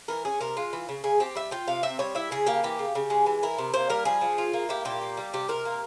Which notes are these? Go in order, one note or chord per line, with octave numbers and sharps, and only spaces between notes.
E3 A#4
C#4 G#4
C3 A#4
G#3 F4
E3
C#3
C#3 G#4
C4 G4
G3 E5
F4 G5
C3 F5
C4 E5
G3 C#5
E4 E5
C#3 G#4
A#3 G4
E3 G4
C#3
C#3
G#3
E3
E4 A#4
C3
A#3 C5
G3 A#4
F3 G#4
F3
F4
A#3
E4 G4
A#2 G4
A#3
G3
C3 G4
C3 A#4
A#3